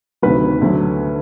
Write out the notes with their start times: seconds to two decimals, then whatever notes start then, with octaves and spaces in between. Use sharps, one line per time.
0.22 D2 C3 D#3 F#3 B4
0.61 D2 D3 F#3